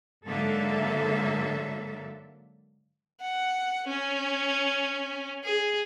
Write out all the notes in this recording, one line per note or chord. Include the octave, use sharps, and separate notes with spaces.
G#2 D3 F#3 A#3 A4 E5
F#5
C#4
G#4